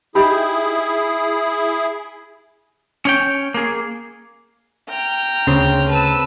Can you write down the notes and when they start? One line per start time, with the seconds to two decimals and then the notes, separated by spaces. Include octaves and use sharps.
0.15 D#4 E4 G4 G#4 B5
3.05 C#4 C#5 G5
3.54 A#3 G#4
4.89 G5 A#5 F6
5.47 D2 C#3 C4
5.89 B4 A5 E6